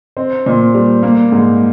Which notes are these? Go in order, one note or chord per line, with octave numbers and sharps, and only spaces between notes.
C4
A#2
G3
A#3
G#2